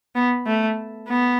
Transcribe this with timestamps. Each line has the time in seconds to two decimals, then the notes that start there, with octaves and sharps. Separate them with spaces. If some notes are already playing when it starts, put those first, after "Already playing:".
0.15 B3
0.47 A3
1.09 B3